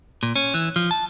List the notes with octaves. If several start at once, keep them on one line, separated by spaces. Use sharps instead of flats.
A#2
C#4
E3
F3
A5